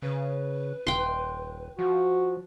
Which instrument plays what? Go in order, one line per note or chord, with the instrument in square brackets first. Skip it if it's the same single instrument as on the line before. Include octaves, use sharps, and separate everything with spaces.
[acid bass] C#3 [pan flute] B4
[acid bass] D#1 [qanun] G5 C6
[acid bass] F3 [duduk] F#4